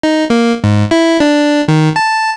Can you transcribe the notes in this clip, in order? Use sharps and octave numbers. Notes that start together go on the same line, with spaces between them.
D#4
A#3
G#2
E4
D4
D#3
A5